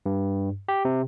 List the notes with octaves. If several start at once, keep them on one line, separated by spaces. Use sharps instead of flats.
G2
G4
C3